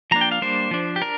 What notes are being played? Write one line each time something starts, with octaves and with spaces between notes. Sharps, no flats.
F3 A#3 D4 A#5
G5
F5
G3 A#3 D4 C5
F3 D4
G4
D4 A#4